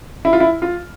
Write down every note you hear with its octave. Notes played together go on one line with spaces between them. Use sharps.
E4
F4
E4
F4